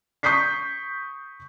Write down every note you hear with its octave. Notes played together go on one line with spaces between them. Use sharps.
C#6 D#6 G6 B6 C7